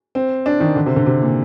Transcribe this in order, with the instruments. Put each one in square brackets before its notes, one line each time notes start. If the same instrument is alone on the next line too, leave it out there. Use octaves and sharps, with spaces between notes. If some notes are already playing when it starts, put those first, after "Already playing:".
[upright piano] C4
D4
D#3
D3
C3
D3
C3
A#2